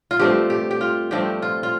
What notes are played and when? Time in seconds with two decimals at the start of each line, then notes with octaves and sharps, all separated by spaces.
0.11 F4
0.19 G2 F3 A3 C4 G4
0.50 G4
0.71 G4
0.81 F4
1.11 G2 F3 A3 C4 G4
1.42 F4
1.63 F4